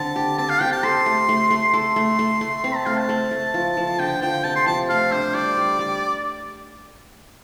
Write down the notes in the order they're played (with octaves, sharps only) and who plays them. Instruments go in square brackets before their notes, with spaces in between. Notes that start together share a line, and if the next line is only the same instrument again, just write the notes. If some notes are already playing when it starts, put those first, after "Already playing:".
Already playing: [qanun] D3 C4 [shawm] A5
[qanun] G4
[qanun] C4 [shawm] A5
[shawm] F5
[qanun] G4 [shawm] G5
[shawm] A5
[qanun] A4 [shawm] C6
[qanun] A3
A3
A3
[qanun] A4 [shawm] C6
[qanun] A3
A3
A3
[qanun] C4 [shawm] C6
[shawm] A5
[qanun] A3 [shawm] F5
[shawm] A5
[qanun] A3
A3
F3
F3
[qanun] D3 [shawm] G5
[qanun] F3 [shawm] G5
[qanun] C3 [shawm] A5
[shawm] C6
[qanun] F3 [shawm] A5
[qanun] A3 [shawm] F5
[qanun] D4 [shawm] C5
[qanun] G3 [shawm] D5
[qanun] G3
G3